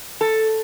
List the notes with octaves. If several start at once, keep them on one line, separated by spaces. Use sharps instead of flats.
A4